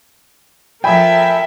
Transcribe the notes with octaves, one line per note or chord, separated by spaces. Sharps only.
F3 A4 A#4 E5 G5 G#5 B5